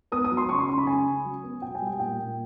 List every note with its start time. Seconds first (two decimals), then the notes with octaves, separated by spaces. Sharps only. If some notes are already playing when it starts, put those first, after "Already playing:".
0.12 B3 D#6
0.24 D#6
0.31 F#3
0.37 C6
0.49 C#3 C#6
0.59 C6
0.68 C#3 C#6
0.78 B5
0.87 C#3 G#5
1.06 C#3
1.25 F#3
1.43 B3
1.62 B2 G5
1.75 G#5
1.81 G3
1.87 G5
1.99 A#2 G5
2.19 A#2